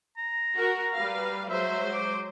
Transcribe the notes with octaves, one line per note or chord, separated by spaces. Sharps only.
A#5
F#4 A#4
G3 B4 F5
F#3 G#3 C5 E5
D6